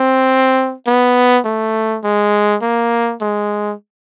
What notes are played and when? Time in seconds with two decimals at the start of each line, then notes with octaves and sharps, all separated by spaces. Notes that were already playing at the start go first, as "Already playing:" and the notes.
Already playing: C4
0.87 B3
1.45 A3
2.04 G#3
2.62 A#3
3.21 G#3